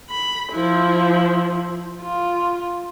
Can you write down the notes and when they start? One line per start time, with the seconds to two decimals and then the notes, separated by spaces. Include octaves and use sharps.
0.11 B5
0.52 F3 E4
2.00 F4